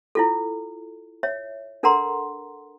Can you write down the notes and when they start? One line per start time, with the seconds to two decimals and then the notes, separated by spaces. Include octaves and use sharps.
0.15 E4 F4 A4
1.23 C#5 E5
1.83 D4 A4 A#4 F#5 A#5 C6